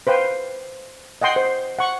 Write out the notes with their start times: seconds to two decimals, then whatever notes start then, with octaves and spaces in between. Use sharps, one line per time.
0.07 B4 C5 F5 G5
1.21 D#5 F#5 G5 C6
1.36 C5
1.79 F#5 C#6